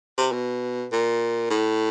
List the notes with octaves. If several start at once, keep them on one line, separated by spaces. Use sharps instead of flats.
C3
B2
A#2
A2